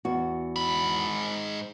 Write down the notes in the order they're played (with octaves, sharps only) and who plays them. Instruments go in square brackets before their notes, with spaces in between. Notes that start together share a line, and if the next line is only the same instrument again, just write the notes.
[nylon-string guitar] E2 F#4
[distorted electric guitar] G#2 B5